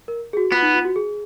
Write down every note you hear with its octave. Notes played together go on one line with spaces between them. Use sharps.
A#4
G#4
F#4
B3 F4
D#4
F4
F#4
G#4